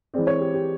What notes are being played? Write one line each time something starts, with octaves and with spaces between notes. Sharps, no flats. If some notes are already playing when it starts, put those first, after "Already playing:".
E3 G#3 C4 D5
C#5
G4
G4